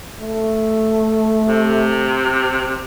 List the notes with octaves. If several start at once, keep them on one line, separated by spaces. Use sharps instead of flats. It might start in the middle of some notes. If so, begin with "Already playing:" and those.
A3
C3